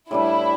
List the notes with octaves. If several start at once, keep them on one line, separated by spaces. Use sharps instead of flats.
A2 G3 D4 E4 B4